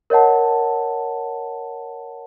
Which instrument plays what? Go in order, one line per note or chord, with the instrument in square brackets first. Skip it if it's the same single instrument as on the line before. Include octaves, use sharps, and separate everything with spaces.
[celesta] A#4 C#5 D#5 F#5 A5